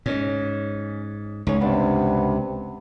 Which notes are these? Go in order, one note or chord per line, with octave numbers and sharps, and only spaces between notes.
G#2 C#4 D#5
C#2 D#4 G#4 C#5
G2 C3 B3 D4